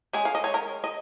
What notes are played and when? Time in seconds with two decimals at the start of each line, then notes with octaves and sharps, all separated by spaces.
0.13 G#3 C#4 G#4
0.25 F5
0.35 D#5
0.44 C#5
0.54 A#4
0.84 D#5